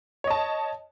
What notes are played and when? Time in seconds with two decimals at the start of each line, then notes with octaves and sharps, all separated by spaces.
0.24 C#5
0.27 D#5
0.30 A5